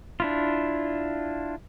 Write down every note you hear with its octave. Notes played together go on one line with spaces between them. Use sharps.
D4 E4 F4